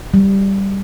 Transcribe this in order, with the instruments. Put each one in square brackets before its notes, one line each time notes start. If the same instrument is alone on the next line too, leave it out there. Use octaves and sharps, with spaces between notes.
[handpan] G3